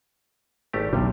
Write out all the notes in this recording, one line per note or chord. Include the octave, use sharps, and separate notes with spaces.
G#1 A3 G4
B1 A2 C3 G3